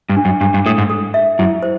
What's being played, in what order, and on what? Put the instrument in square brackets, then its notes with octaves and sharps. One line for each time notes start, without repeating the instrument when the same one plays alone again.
[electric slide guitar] G2
[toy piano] D4
[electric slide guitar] F#2
[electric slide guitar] G2 [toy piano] D4
[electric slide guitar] G2
[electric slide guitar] A2 [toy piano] A4
[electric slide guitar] G#2
[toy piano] A4
E5
[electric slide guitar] F#2 [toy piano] E4
[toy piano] C5